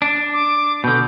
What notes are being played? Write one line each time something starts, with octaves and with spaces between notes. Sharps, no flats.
D4
D6
B2 D3 G6